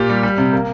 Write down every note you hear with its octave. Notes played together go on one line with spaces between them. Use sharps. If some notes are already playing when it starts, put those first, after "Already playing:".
Already playing: A#2 G4
G3
G3
C3
A#3